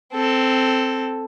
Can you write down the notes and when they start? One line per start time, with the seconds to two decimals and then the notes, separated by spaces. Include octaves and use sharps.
0.13 C4 A4